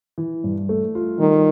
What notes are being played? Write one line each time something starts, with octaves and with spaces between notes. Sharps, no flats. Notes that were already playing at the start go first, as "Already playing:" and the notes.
E3
G2
A3
F4
D#3 G3